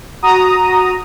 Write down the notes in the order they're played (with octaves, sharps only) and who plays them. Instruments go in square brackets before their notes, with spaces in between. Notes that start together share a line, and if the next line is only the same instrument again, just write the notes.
[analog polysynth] F#4 A#5 D#6